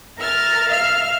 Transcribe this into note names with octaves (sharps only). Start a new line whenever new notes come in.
A#4 E5 F6 A6
E5 F5 F6